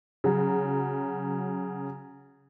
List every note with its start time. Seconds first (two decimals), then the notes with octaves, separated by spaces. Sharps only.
0.24 C#3 F#3